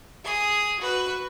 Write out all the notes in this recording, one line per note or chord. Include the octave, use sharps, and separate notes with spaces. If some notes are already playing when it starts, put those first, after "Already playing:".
G#4 D#6
F#4 B4